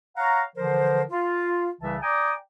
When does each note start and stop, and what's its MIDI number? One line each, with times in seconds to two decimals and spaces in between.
0.17 0.41 73
0.17 0.41 77
0.17 0.41 78
0.17 0.41 82
0.56 1.02 50
0.56 1.02 52
0.56 1.02 53
0.56 1.02 70
0.56 1.02 72
1.09 1.70 65
1.81 1.97 36
1.81 1.97 49
1.81 1.97 52
1.81 1.97 76
1.81 1.97 81
2.02 2.33 74
2.02 2.33 79
2.02 2.33 80
2.02 2.33 82
2.02 2.33 86
2.02 2.33 87